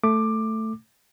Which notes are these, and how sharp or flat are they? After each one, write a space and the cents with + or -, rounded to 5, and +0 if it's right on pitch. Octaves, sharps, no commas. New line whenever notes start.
A3 +5 D6 +15